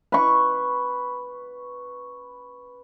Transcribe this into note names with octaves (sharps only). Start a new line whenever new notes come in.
B4 C#6